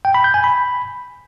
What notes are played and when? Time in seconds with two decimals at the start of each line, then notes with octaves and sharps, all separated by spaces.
0.05 G5
0.14 B5
0.24 G6
0.34 G#5
0.44 B5